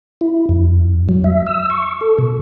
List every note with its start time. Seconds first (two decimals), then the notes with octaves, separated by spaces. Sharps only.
0.21 E4
0.49 F2
1.09 F#3
1.24 E5
1.46 E6
1.70 C#6
2.01 A4
2.18 B2